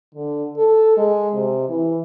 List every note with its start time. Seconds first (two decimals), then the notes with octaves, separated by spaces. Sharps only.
0.15 D3
0.57 A4
0.97 G#3
1.34 C3
1.69 E3